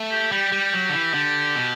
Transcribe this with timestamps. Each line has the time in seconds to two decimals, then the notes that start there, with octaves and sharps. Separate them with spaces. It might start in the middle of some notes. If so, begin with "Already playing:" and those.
Already playing: A3
0.11 G4
0.32 G3 G4
0.52 G3
0.74 F#3
0.89 D3
0.93 E3
1.14 D3
1.55 B2